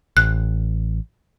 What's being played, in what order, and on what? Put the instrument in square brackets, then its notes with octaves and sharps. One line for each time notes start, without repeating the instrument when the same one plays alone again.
[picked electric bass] A1 [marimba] F#6